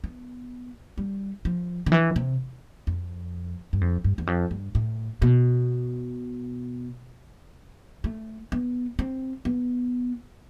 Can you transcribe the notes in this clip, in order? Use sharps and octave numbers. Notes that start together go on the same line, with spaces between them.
B3
G3
F3
D3
E3
C3
F2
G2
F2
G2
E2
F2
G2
A2
B2
A3
B3
C4
B3